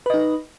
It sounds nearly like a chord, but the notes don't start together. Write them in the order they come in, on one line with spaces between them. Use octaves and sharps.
B4 D#5 D#4